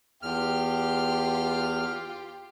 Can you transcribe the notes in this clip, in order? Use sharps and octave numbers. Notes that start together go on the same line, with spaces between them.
E2 F4 G4 F6